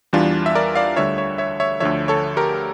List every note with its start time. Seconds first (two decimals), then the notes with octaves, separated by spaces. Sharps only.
0.13 E2 E3 G3 D4 F4
0.46 E5
0.55 A#4 D5
0.75 D5 F5
0.96 D2 D3 G3 C#5 E5
1.18 C#5 E5
1.38 C#5 E5
1.60 C#5 E5
1.80 D2 D3 F3 C#5 E5
2.08 A4 C#5
2.37 G4 A#4